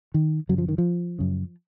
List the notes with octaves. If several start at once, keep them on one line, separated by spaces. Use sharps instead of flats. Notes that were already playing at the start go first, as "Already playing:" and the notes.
D#3
F#2 C#3 F#3
F3
D#3
F3
F#2 C#3